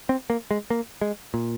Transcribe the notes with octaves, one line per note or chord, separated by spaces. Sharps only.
C4
A#3
G#3
A#3
G#3
A#2